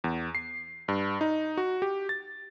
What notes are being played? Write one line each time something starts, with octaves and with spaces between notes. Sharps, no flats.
E2
C7
G2
D#4
F#4
G4
A6